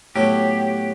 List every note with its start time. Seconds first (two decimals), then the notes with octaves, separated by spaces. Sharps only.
0.15 A2 F#3 B3 F#4 G4 A4